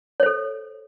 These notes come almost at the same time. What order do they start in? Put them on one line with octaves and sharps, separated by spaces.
C#5 C5 A4